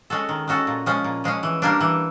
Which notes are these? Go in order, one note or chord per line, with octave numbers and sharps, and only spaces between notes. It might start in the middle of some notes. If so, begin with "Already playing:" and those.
G#3 C#4 F#4 A4
D#3
G#3 C#4 F#4 A4
A#2
F3 G#3 C#4
A#2
F3 G#3 C#4
E3
G3 A#3 D4
E3